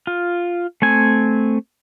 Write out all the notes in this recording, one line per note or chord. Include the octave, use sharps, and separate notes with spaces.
F4
A3 C4 G#5